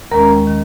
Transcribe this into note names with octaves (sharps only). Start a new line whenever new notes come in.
D#2 D#3 G#3 C#4 A#4 A#5
D#3